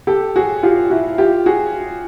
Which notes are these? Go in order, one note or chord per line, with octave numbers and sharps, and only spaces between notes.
G4 A4
F#4 G#4
F4 G4
E4 F#4
F4 G4
F#4 G#4